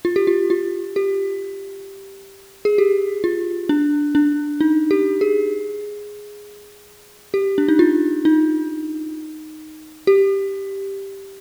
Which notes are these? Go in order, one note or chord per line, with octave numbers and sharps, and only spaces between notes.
F4
G4
F4
F4
G4
G#4
G4
F4
D4
D4
D#4
G4
G#4
G4
D4
D#4
F4
D#4
G4